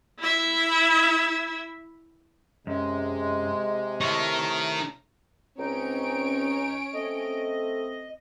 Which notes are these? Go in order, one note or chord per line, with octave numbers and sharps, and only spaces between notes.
E4 E5
F#2 C3 G#3
A3 D#4 E4 A#4 C#5
C#2 C4 C#4 D#4 C#5 D7
A3 C4 D#5